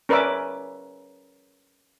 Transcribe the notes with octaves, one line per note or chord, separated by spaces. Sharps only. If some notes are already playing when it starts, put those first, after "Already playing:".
C#4 A#4 B4 D5 E5 D6